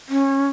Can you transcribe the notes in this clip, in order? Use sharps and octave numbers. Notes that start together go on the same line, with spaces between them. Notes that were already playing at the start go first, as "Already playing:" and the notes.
C#4